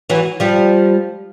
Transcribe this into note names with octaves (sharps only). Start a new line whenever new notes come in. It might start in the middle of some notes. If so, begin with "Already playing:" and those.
E3 F#3
F3 G3